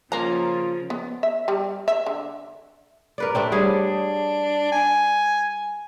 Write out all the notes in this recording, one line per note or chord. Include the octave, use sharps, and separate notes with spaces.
C#3 F3 A#3 C#4 F4 A#5
B3
E5
G3
E5
D3
A#4 B4 D5
A3 C4 D4 G4
G3 D4 G#4 C#5
G#5